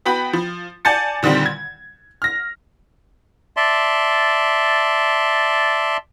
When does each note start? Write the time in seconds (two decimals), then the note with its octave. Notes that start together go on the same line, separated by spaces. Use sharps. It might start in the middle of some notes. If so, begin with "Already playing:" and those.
0.06 B3 F#4 G5 B5
0.33 F3
0.85 D5 G#5 A5 G6 A6 C#7
1.23 A#2 D3 D#3 G3 C4
1.46 G#6
2.22 F6 A#6
3.57 D5 E5 A5 C6